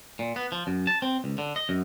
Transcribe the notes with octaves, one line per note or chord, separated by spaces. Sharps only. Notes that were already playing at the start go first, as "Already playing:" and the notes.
A#2
B3
F3
F#2
A5
C4
C#2
D3
D#5
F#2